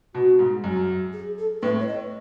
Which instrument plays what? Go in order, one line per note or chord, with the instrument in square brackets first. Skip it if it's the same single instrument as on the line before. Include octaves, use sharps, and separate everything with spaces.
[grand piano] B2 [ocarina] F#4
[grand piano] G#2
F#2
[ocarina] G#4
A4
[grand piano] A2 [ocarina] B4
[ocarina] C#5
D#5